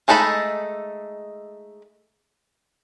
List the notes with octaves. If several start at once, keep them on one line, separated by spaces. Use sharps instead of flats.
G#3 A3 D#4 A4 B5